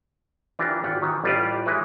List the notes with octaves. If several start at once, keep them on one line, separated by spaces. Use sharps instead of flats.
E3 D4 F4 G4 A#4
G#1 F4 G4 F#5
D#3 E3
A1 G3 F4 G4 B4 D5
E3 G#3 D#4 E4 B4